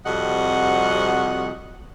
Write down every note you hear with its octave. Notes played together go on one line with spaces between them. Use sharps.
F2 C3 G3 F#4 D#5 F#5